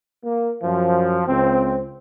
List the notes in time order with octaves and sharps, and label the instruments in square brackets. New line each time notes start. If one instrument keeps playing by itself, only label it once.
[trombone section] A#3
F#2 F3
C#2 C4